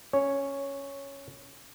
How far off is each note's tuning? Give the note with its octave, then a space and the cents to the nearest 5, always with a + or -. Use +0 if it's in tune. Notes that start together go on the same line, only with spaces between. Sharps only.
C#4 +0 C#5 +0